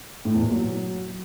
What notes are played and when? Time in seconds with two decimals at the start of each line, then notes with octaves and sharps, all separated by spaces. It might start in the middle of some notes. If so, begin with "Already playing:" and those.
0.25 A2
0.34 E2
0.42 A#2
0.51 F#3